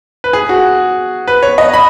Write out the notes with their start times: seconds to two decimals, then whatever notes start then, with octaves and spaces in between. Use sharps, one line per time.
0.24 B4
0.33 G#4
0.49 F#4
1.28 B4
1.43 C#5
1.58 D#5
1.74 B5